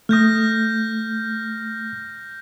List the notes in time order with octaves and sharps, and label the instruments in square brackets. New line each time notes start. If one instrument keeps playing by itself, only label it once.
[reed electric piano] A3 D#6 [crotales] F6 G6 A#6